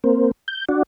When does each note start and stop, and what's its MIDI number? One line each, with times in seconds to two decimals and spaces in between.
0.04 0.31 58
0.04 0.31 60
0.48 0.65 91
0.69 0.83 62
0.69 0.83 66